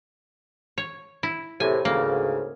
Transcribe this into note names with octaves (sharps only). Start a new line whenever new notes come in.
C#5
E4
E2 A2 C3 G#5
D2 G#2 C#3 A#3